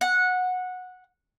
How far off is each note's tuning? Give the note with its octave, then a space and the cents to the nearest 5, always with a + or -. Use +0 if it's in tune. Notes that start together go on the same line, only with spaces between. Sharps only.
F#5 -15